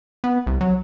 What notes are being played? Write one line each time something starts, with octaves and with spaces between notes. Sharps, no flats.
B3
C2
F#3